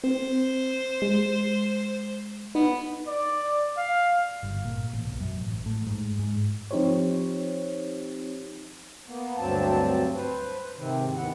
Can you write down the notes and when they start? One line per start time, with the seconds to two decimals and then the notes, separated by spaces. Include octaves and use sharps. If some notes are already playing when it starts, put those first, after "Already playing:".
0.04 C4 C5
1.02 G#3
2.55 B3 D#4
3.07 D5
3.78 F5
4.43 G1
4.65 A#2
4.93 A1
5.06 B1
5.20 F#2
5.41 A1
5.66 A2
5.87 G#2
6.19 G#2
6.71 F3 C4 D#4 G4 C5 C#5
9.06 A#3 B3
9.38 D2 G2 F#3 C4 A5
10.16 B4 C5
10.77 G#2 C3 D#3 C4
11.16 D#2 C3 D#3 B3 E4 F#5